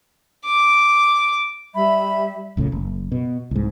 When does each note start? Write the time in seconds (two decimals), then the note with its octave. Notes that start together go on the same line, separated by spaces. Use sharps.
0.45 D6
1.75 G3 E5 B5
2.57 D#1 C#2 A2 C#3
2.72 F#1
3.12 B2
3.51 C2 G#2